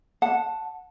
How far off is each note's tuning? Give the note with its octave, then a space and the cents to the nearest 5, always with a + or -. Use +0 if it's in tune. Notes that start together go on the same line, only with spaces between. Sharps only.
F#5 -15 A5 +0